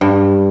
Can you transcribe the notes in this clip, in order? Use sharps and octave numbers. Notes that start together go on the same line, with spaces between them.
G2